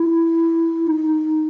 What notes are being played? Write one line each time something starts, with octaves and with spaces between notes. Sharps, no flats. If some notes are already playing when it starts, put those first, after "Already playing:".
Already playing: E4
D#4